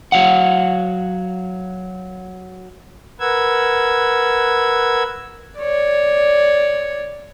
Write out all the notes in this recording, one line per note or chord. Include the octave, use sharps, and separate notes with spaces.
F#3 F5 F#5
A#4 B4 F#5 E6 G#6
C#5 D5